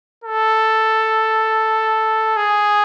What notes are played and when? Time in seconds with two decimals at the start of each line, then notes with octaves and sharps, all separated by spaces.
0.24 A4
2.37 G#4